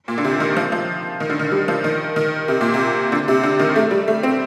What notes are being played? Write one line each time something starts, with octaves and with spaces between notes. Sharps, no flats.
A#2
D3
C3
D#3
F3
F3
D#3
D3
D#3
G3
F3
D#3
D#3
C3
A#2
C3
D3
C3
D3
D#3
A3
G3
A3
C4